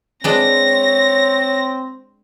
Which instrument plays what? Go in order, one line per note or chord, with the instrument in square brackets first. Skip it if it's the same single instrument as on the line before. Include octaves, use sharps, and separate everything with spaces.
[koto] G#3 D4 B4 [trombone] C4 [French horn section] C#5 [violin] A#6